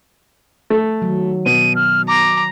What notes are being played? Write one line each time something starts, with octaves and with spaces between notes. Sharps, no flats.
A3
D#3 F#3
B2 D#7
F6
A#5 D6